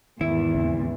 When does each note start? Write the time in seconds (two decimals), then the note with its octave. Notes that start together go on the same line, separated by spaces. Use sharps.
0.21 E2 G#2 D#3 E4
0.54 D#2 C#3 C4